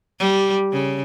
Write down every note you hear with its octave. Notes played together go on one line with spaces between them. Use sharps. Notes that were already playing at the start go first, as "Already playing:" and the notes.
G3
C#3